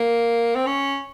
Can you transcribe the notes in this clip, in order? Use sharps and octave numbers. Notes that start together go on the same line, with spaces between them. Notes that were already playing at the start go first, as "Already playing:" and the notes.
Already playing: A#3
C4
C#4